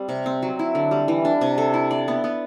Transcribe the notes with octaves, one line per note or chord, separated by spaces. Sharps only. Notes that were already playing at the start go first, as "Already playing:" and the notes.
Already playing: G3 C4
C3
C4
F#3
E4
D3
G3
E3
D4
C3
A4
E4
D5
B3
B3